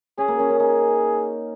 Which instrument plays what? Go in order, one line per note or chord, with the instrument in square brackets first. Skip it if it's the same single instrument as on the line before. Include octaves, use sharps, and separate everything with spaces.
[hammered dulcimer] C#4 [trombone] G#4
[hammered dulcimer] A#3
C#4
C#4
[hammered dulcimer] D#4 [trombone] G#4